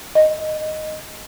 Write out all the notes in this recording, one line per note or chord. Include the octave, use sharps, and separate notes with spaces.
D#5